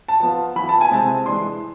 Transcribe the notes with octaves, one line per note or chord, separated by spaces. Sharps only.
A5
F3 B3 F4
E3 B3 E4 B5
A5
G#5
C3 G#3 C4 E4 A5
E3 G#3 D4 C6